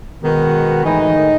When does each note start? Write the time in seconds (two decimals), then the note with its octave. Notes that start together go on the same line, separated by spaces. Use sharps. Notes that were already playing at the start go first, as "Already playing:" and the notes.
0.23 B2 D#3 G#3 B3 F#4
0.85 A2 E3 G#3 D#4
1.01 E3
1.15 D#3